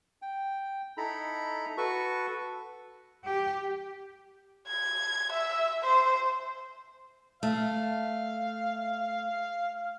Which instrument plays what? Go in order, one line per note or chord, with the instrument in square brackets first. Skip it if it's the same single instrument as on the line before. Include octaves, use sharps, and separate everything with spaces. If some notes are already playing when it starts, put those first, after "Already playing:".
[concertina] G5
D#4 E4 A4 A#5 B5
F#4 A4 B4 C#6
[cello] G4
[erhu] G#6
E5
C5
[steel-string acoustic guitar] A3 [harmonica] F5